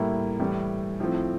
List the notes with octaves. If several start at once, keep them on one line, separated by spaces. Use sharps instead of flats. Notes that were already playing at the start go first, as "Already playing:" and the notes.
Already playing: A2 G3 A#3 E4
A2 E3 G3
A2 F3 C4